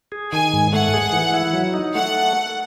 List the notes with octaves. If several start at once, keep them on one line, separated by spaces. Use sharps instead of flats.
G#4
D#3 G#5
G#2
A3 F#5
G#4
E3
E4
F#3
D#4
A3 F#5